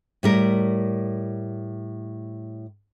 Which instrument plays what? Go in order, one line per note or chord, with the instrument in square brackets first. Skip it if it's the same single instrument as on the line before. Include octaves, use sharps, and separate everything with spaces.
[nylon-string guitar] A2 G3 A#4